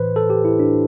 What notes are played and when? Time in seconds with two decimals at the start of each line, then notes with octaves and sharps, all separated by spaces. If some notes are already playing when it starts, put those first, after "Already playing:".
Already playing: A2 E3 B4 C5
0.16 A4
0.30 G4
0.45 E4
0.60 D4